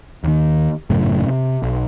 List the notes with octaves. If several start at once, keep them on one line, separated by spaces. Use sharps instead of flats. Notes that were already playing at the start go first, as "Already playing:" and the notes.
D#2 D#3
G#1 F#2 A2 C#3
C3
B1